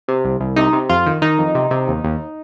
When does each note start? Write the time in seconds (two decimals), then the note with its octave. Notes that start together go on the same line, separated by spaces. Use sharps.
0.08 C3
0.24 C2
0.40 C2
0.56 C3 D#4
0.73 C3
0.89 F2 F4
1.06 D#3
1.22 D#3 D#4
1.38 F2
1.55 C3
1.71 C3
1.88 D#2
2.04 D#2